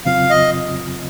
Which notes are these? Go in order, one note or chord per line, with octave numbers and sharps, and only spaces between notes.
F2 C#3 F#3 C4 F4 F5
D#5